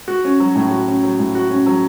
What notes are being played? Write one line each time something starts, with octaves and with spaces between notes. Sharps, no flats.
F#4
C#4
F#3
A2
F#4
C#4
F#3
A2
F#4
C#4
F#3